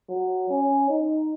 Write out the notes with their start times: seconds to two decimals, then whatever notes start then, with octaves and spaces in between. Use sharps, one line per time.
0.09 F#3
0.50 C#4
0.90 D#4